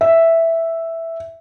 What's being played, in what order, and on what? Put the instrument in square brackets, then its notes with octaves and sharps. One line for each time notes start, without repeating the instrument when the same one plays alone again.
[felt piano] E5